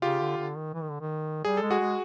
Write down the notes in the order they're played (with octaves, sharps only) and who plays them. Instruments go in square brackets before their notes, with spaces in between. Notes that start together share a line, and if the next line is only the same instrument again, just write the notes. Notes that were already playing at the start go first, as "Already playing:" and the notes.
[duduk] C#3 [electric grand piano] F4 G4
[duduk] D3
D3
D#3
E3
D#3
D3
D#3
[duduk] G3 [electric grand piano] G#4
[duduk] G#3 [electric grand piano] A4
[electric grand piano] F#4 G#4
[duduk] G#3